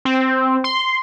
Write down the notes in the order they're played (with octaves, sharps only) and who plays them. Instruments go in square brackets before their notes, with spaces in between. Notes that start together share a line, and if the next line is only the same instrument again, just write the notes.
[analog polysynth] C4
C6